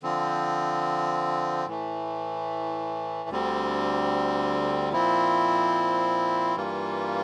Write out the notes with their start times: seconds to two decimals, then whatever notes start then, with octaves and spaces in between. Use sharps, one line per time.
0.03 D3 F3 C4
1.66 A2 E3 A3
3.29 D2 D3 G3 C4
4.93 A#2 F3 C4 E4
6.56 G2 E3 G3 A#3 F4